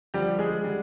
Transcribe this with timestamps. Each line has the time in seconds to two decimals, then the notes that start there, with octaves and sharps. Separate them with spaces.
0.14 D3 F3 G3 G4
0.39 G#3 G#4
0.64 D3 G3